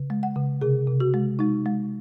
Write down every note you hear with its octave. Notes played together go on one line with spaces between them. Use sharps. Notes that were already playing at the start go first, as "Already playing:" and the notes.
Already playing: C#3
G#3
F#5
C#3
C3 G#4
C3
F#4
G#3
G#3 D#4
G#3